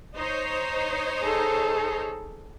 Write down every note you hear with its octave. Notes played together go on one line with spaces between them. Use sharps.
D#4 C5 C#5
G#4 A4